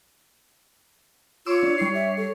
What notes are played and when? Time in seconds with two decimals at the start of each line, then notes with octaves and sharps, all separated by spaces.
1.46 F4 C#5 C6 D6 E6
1.63 D4
1.78 G3 E4 C7
1.94 E5
2.17 A4